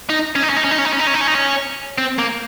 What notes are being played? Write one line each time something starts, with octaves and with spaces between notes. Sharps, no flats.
D#4
C#4
D#4
C#4
D#4
C#4
D#4
C#4
D#4
C#4
D#4
C#4
D#4
C#4
D#4
C#4
C4
A#3